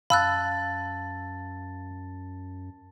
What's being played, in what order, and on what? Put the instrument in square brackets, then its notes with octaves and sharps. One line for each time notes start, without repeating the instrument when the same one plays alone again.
[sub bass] F#2 [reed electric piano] F5 [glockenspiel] A5 A6 [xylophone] B5 E6 F#6